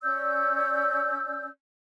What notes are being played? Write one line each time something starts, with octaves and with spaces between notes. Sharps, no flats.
C#4 D5 E6 G6